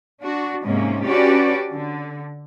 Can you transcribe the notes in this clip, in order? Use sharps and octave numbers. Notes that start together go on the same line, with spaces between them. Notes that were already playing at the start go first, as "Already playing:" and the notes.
D4 F#4
G#2 C3 A#3 C#4
C#4 D4 F#4 G4 B4 D5
D3